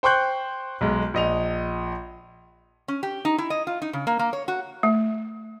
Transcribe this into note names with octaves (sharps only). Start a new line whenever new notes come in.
C5 G5 C6 C#6 F#6 G6
B1 G#3
A#1 D#5 F7
C#4
G4
D#4
E4
D#5
F4
D#4
C#3
A#3
A#3
C#5
F#4
A3